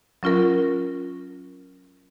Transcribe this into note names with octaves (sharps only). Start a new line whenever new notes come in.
F#3 C#4 F4 A#4